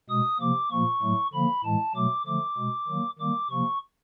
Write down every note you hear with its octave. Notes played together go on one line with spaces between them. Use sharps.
B2 G#3 D#6
C3 F3 A#3 D6
A#2 F3 A#3 C#6
A2 F#3 A3
D3 F3 A#3 B5
A2 E3 G#3 A5
B2 F#3 A3 D6
D3 F3 A3 D6
B2 G#3
D#3 F#3 A#3
D#3 G3 A#3 D6
C3 F3 A#3 C#6